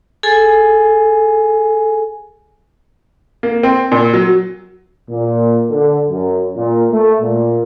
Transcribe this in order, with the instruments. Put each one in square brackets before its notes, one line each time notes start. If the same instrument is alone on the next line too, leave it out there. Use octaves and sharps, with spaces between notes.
[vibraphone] G#4 A4 G#5
[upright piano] A#3
C4
A#2
F#3
[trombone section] A#2
D3
F#2
A#2
A3
A#2